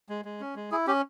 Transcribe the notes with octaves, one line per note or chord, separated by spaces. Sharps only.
G#3
G#3
C#4
G#3
E4 G#4
C#4 G4